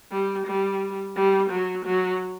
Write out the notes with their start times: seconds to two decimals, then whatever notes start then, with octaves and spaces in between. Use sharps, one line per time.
0.11 G3
0.46 G3
1.16 G3
1.50 F#3
1.86 F#3